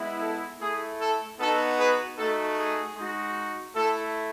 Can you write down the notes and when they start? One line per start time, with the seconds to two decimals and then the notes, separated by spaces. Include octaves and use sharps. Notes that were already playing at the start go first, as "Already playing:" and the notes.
Already playing: G#3 B3 E4
0.21 A4
0.60 A3 E4 G#4
0.99 A4
1.39 B3 D#4 F#4 A4
1.78 G#4 B4
2.17 A3 D#4 F#4 A4
2.57 G#4
2.96 G#3 D#4 F#4
3.75 A3 E4 A4